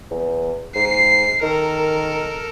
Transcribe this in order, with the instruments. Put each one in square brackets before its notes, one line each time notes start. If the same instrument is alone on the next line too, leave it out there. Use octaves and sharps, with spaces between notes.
[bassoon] E2
[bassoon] G#2 [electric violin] C7
[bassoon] D#3 [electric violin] A4 A#4